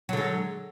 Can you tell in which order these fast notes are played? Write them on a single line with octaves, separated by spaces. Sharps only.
F#3 D3 G#3